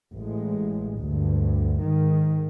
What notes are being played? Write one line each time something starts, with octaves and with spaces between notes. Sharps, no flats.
A1 G#3
D2 G2
G#2 D#3